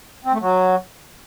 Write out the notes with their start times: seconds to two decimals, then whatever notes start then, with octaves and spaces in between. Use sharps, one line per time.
0.25 C4
0.32 A3
0.40 F#3